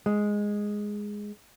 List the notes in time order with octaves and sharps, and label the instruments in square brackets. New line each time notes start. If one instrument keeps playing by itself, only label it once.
[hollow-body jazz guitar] G#3